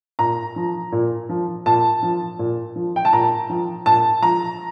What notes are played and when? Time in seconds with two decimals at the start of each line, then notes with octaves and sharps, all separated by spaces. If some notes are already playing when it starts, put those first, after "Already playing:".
0.19 A#2 A#5
0.56 F3
0.92 A#2
1.29 F3
1.66 A#2 A5
2.03 F3
2.39 A#2
2.76 F3
2.96 G5
3.05 A5
3.13 A#2 A#5
3.50 F3
3.86 A#2 A5
4.23 F3 A#5